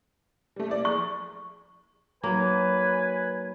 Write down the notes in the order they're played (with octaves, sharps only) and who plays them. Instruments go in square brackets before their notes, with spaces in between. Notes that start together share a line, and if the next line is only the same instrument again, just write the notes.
[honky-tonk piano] G3 A3
A#3 E4 D5
[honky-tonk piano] G#4 [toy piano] C#6
[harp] F#3 D#4 [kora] A#3 [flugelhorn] B4 [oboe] G#5